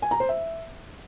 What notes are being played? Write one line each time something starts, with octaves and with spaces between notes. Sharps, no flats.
G#5
A#5
C5
E5